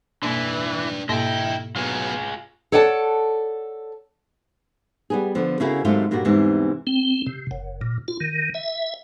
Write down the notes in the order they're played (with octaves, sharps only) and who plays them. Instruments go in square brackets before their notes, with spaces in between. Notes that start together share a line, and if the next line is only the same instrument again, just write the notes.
[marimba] B2 A#3 [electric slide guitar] E3 [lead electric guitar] D4 B4
[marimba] G#2 B2 A#3 [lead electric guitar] E4 [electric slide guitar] D#5 G5
[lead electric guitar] F#3 B3 [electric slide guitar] F4 G#4
[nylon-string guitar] A4 C#5 D5 F#5 G#5 A5
G3 B3 G#4
D3 F3 B3
C#3 C#4 E4 F#4 G#4 A#4
G#2 C3 D#3 F#3 A3 F4
G2 A#2 G3 A#3 F#4
E2 G#2 C3 E3 G3
[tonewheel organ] C4
C3
F#1
A#2
F4
D#3
E5